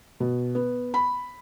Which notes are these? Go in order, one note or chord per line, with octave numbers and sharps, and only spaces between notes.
B2
B3
B5